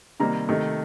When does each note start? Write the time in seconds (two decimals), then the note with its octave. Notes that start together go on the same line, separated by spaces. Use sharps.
0.20 C3 D#3 G3 A#3 A#5
0.49 C3 D#3 A3